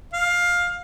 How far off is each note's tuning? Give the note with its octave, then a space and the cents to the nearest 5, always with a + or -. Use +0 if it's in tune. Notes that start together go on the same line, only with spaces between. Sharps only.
F5 +15